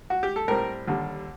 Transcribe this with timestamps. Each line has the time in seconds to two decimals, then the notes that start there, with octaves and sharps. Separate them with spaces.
0.10 F#4
0.23 G4
0.36 A4
0.48 A2 G3 C4 A#4
0.88 D#2 D3 G3